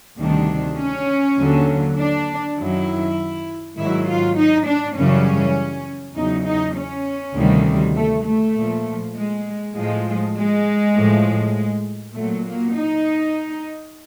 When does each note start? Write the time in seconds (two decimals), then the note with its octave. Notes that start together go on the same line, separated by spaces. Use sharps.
0.18 D2 C3 D#3 G3 D4
0.78 C#4
1.38 D#2 D3 F#3
1.98 D4
2.57 F#2 D#3 F#3 E4
3.77 G#2 D#3 F#3 E4
4.07 F4
4.36 D#4
4.66 D4
4.96 F#2 C#3 E3 G3 C#4
6.16 E2 C#3 F#3 D#4
6.46 D#4
6.77 C#4
7.35 D2 C3 D#3 G3
7.95 A3
8.25 A3
8.56 A#2 F3
9.15 G#3
9.74 A2 F3 G#3
10.35 G#3
10.95 A2 F3
12.14 A#2 F#3 A3
12.45 A#3
12.75 D#4